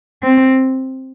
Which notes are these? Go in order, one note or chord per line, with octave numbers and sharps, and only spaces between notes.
C4